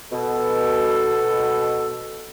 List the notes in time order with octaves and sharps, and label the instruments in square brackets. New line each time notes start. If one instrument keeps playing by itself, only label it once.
[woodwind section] B2 [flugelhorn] A4